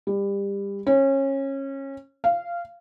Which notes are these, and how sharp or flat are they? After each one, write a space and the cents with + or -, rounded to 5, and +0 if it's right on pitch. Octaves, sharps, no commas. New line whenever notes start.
G3 +25
C#4 -25
F5 -15